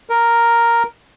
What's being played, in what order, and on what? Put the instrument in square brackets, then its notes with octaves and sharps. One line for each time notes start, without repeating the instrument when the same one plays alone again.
[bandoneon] A#4